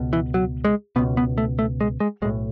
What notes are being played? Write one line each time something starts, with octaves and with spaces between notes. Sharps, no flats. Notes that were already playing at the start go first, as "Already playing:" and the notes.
Already playing: C#2 B2
E3
F#3
G#3
C#2 B2 B3
B3
A3
A3
G#3
G#3
B1 A2 G#3